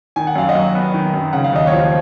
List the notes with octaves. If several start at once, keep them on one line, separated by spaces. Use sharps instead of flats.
D#3 G#5
F#5
F#2 F5
D#5 F#5
F#3
B3
D#3
F#2
C#3 F#5
F5
D#2 D#5
C#5 F5
F3